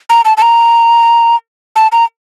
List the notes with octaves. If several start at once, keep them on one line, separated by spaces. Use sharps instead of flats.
A#5
A5
A5
A#5
A5
A#5